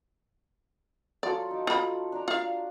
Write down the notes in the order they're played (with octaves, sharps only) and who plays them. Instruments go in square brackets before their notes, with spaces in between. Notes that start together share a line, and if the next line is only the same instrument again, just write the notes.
[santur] F#3 F4 A4 [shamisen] D5
[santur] D#4 D6
[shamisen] F4 B5
[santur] D4 D5 A#5
[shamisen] F4 F5